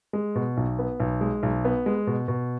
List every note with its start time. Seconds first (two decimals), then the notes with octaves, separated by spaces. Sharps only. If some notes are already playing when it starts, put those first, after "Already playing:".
0.13 G#3
0.35 B2
0.57 B1
0.79 B3
1.00 B1
1.21 G#3
1.43 B1
1.65 B3
1.86 G#3
2.07 B2
2.28 B2